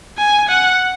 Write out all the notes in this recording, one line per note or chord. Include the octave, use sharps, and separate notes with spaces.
G#5
F#5